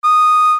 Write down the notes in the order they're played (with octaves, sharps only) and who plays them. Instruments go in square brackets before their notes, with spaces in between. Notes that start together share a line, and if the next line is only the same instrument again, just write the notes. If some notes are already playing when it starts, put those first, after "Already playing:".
[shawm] D#6